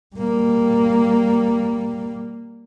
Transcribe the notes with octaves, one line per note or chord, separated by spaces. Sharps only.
G3 A#3